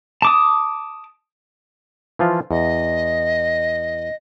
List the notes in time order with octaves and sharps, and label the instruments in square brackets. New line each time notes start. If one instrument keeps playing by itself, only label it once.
[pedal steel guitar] A5 D6 D#6
[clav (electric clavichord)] E3 F3 F4
[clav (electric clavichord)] E2 [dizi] D#5